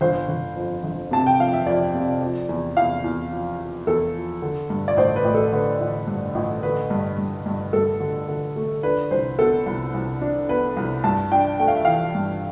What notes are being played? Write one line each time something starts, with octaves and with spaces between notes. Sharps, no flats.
G1 C5
G1
F2
G1
C3 A5
G5
F2 F5
E5
F2 D5
C3
F3
E2
E2 F5
E2
F3
F3
E2 A4
F3
D3
G2
D5
A1 C5
B4
A1
A4
D3 B4
A1
G2
A1
D3 B4
G2
G2
G2
G2 A4
D3
D3
A3
D4 B4
C2 C5
B3 A4
C2
C2
D4
B3 B4
C2
G2 A5
D4 G5
A3 G5
F5
E5
E3 F5
G2